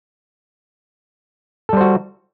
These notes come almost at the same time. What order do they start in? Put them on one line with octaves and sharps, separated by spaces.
A4 G3 C5 F#4